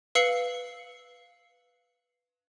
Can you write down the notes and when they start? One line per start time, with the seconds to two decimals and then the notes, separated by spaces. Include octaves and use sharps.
0.15 B4 F5 E6 C7 C#7 F#7